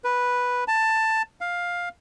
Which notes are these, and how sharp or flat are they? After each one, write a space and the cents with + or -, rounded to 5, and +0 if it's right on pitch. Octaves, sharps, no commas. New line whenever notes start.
B4 -5
A5 +10
F5 +10